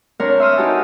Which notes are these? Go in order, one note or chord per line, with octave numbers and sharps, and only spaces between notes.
C4 D4 A#4 C#5
E5 C6 D#6 F6
D#4 F#4 G4 B4 G#5 A5